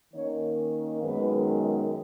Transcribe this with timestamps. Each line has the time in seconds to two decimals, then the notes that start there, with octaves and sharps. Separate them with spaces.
0.13 D#3 A#3 C#4 C#5
1.02 F#2 D#3 G#3 B3 D#4 B4